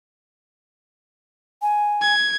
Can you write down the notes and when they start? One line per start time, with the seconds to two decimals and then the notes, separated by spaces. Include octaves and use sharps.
1.62 G#5
2.01 G#6